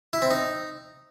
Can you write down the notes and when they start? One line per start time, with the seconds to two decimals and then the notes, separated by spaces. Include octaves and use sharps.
0.13 E4
0.22 C4
0.31 D#4